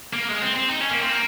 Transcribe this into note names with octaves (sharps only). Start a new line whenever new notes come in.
A#3
G#3
C4
C4
D#4
C#4
A#3
C4
A#3